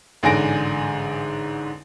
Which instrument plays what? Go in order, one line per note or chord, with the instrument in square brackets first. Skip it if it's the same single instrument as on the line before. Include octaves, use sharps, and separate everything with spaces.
[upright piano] A1 G#2 D3 G#5 A#6 D7